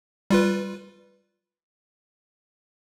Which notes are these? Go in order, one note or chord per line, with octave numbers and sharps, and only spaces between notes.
G3 F4 B4